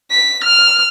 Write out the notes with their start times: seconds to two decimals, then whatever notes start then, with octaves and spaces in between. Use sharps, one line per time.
0.11 B6
0.44 F6